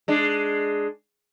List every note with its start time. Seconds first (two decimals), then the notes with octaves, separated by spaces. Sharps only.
0.08 G#3 D4